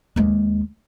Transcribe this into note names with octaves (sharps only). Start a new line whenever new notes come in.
D#2 G#3